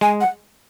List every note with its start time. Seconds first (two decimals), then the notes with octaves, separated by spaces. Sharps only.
0.01 G#3 G#5
0.21 F#5